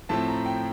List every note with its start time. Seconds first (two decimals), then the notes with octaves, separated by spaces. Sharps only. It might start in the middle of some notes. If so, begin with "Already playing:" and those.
0.09 A2 F3 A3 C4 A5
0.28 A#5
0.46 G5